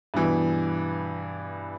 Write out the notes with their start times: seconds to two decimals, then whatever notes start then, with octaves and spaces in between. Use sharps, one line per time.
0.14 G2 B2 E3